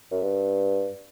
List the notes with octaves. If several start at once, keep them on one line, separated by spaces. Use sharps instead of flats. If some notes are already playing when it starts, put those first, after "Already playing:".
F#2
G2